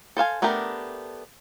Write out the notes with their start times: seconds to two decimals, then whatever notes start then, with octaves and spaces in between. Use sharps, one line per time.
0.17 A4 C5 F5 G#5
0.42 A3 B3 D4 G4 A#4